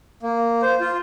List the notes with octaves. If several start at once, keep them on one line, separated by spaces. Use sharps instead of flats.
A#3
C5
F4